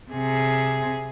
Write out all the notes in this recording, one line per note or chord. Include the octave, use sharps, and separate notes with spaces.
C3 G#4